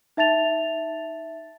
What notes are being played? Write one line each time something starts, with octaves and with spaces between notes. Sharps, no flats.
D#4 E5 A5 A6 F7